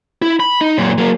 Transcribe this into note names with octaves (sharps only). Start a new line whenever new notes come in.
E4
B5
D#4
F#2 A#2
F#3 A#3